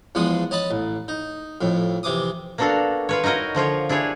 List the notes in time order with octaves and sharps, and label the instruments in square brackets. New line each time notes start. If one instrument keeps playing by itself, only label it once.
[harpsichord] E2 F3 G#3 F#5 D#6
C#5 D#5 A5 B5
A1
D#4
F2 A2
C3 E3 D6 D#6
[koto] A#3 B3 D4 F#4 A4 F5
F4 B4 C#5
D#4 E4 F#4 A#4 D#5
D3 F3 F4 C#5
D4 E4 G4 G#4 C#5